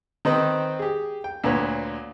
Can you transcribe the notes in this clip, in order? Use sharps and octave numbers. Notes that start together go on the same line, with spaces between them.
D#3 C4 D#4 B4 C5
G4 G#4
G5
D2 A#2 B4 C#5